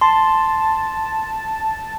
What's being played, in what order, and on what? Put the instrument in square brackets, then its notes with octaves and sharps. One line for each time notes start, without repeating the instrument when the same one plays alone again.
[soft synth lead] A5 [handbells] C6